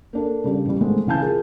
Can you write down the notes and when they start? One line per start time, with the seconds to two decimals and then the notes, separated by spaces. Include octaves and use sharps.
0.13 A#3 D4 A4
0.44 C#3 G3 D4 G4
0.66 A1 G3
0.81 D#3 G#3 A3 B3 C4
1.07 C#2 E3 F5 G#5 A5 G6
1.22 F4 G#4 A#4